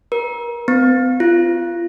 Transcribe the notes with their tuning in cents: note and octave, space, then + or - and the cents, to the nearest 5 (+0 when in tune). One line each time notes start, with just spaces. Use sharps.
A#4 +30
C4 -45
F4 -25